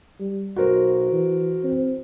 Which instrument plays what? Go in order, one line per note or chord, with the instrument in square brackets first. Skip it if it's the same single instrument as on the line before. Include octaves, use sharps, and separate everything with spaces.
[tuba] G3
[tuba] B1 [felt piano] F#4 A#4 C5
[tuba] E3
C4